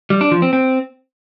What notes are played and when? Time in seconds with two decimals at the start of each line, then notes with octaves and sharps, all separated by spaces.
0.10 G3
0.21 D4
0.32 F3
0.42 C4
0.53 C4